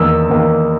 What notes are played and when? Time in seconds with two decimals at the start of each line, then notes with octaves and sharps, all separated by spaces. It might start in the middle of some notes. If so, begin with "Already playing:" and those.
Already playing: E2 D#3 A#3 E6
0.30 E2 D#3 A#3